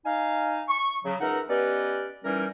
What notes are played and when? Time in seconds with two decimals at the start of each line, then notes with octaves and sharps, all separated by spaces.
0.05 D#4 F5 G#5
0.68 C#6
1.05 C#3 F#3
1.21 C#2 D#4 A#4 B4 E5 F#5
1.49 B3 C#4 G4 B4 D5 D#5
2.24 E3 G3 C#4 D#4 A#4